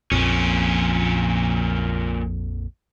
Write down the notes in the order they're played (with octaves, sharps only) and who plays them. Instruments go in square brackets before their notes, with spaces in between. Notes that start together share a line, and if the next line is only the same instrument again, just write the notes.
[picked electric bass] A#1 F2 [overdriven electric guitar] A#2 C#4